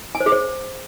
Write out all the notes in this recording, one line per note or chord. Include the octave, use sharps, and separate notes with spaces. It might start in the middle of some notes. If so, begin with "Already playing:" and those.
G#5
C5
G#4
C5